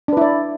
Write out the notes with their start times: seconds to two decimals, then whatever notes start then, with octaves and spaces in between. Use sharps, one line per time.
0.08 D4
0.13 B4
0.17 E4
0.21 D5